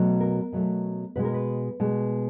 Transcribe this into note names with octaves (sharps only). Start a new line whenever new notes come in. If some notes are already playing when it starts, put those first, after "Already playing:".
Already playing: B2 F#3 A3
A#4
B2 F#3 A3
B2 G#3 B4
A#4
B4
B2 G#3